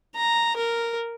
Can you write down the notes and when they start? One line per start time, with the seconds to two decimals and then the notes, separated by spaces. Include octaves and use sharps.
0.16 A#5
0.56 A#4